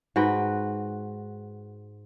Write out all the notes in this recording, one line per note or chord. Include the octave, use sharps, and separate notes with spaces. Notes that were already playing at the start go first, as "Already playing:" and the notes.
G#2 F#4 B4 G5